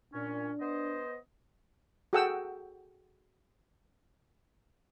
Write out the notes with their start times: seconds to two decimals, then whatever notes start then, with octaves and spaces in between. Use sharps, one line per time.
0.14 A#2 C#4 D4
0.60 B3 C5 D#5
2.13 F#4 G#4 A4 F#5 G5 E6